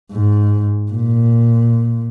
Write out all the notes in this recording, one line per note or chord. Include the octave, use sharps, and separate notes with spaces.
G#2
A#2